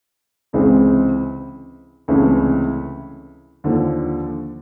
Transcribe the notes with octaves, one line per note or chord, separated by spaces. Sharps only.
C#2 C3 E3 G#3 C4
C#2 C3 E3 A3 C#4
D#2 D3 F3